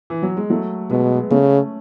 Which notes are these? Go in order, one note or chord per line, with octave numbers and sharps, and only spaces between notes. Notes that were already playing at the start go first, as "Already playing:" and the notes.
E3
F#3
G#3
F#3 A3
B2 G#3 B3
C#3 A3 C#4